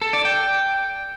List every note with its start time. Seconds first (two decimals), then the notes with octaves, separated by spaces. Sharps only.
0.02 A4
0.13 D5
0.25 G5